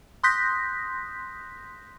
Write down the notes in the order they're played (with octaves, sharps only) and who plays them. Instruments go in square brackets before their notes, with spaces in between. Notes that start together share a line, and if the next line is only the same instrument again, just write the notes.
[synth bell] C6 D#6 F#6 G6 A#6 B6